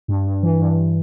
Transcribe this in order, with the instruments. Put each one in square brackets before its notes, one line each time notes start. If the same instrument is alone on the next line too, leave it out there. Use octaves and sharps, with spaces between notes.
[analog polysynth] G2
G2
E3
G2